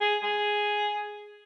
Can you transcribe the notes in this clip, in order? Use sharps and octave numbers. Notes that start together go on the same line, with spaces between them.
G#4
G#4